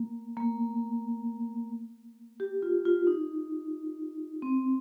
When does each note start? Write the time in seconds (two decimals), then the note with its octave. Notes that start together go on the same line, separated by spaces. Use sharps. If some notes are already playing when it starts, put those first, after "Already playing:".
Already playing: A#3
0.37 A#3
2.40 G4
2.62 F4
2.85 F4
3.07 D#4
4.42 C4